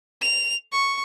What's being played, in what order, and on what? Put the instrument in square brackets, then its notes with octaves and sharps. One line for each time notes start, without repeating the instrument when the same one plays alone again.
[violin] F7
C#6